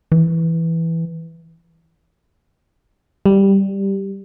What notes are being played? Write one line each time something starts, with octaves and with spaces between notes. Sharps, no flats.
E3
G3